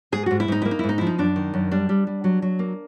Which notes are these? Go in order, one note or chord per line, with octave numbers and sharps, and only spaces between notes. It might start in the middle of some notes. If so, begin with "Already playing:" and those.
G#2 G#4
G#2 F#4
E4
G#2 D#4
A#3 E4
D#4
E4
G#2
D#4
F3 E4
D#4
F#2 D4
D#3
F#2
G3 D4
G3
G3
F#3
F#3
A#3